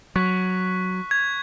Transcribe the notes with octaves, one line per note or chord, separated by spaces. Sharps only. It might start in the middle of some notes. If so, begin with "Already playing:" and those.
F#3 C#6 F#6 B6
G#6